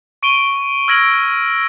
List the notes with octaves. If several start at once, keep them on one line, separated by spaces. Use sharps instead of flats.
C#6 D7 D#7 G7
E6 F6 G#6 A#6 D7 F#7